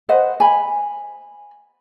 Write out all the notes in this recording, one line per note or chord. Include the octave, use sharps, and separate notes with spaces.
B4 C5 D#5 F#5
G#5 B5